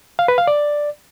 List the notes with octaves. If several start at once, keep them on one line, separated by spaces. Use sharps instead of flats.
F5
B4
F5
D5